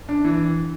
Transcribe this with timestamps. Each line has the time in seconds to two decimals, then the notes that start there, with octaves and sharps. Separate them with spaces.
0.09 D4
0.24 E3